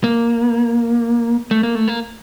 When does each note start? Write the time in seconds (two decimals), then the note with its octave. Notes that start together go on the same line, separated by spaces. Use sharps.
0.04 A#3
1.51 A3
1.63 A#3
1.75 A3
1.88 A#3